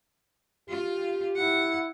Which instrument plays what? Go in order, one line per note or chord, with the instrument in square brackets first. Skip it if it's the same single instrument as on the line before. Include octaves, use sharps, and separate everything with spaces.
[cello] F4 [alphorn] G4
[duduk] E4 [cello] F#5